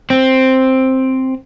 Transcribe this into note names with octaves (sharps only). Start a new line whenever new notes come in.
C4